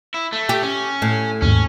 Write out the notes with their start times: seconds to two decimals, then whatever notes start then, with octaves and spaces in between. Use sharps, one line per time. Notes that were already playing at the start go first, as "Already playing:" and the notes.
0.14 E4
0.33 A3
0.49 G4
0.63 C#4
1.02 A2
1.42 D#2 G#2 C#4